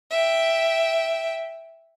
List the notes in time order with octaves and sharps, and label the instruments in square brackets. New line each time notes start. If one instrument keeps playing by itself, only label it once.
[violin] E5 G5